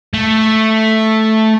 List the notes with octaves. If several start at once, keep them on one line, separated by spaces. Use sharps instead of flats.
A3